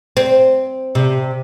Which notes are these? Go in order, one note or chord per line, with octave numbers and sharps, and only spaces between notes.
C4
C3